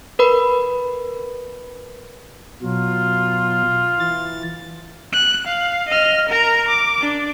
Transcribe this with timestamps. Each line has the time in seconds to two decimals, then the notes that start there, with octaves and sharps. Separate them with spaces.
0.19 A#4 B4 B5
2.62 B2 F#3 F4
4.00 E3 A6
5.13 F#6
5.47 F5
5.89 D#5 F6
6.29 A#4 A#5
6.68 D6
7.01 D4